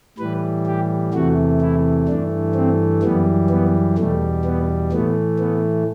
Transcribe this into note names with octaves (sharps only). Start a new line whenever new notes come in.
A2 E3 G3 B4
G4
E2 C3 E3 A3 F#4
E4
G2 E3 A3 D4
C4
F#2 E3 G3 B3
B3
E2 B2 G3 A3
B3
A2 E3 A3 B3
B3